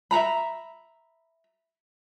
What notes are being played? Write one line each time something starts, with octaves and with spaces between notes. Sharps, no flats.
E5 F#5 A#5 B5